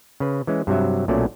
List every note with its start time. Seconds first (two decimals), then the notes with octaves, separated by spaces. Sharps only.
0.20 C#3 B4
0.47 E3 G#3 C#4
0.67 G2 C3 F#3 E5
1.08 B1 A#2 F#3 A3 C#4 D5